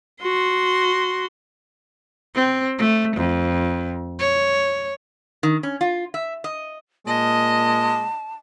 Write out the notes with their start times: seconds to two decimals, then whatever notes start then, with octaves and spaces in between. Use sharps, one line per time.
0.22 F#4 C6
2.35 C4
2.79 A3
3.16 F2
4.19 C#5
5.43 D#3
5.63 C#4
5.81 F4
6.14 E5
6.44 D#5
7.07 A#2 G#3 D#5 A5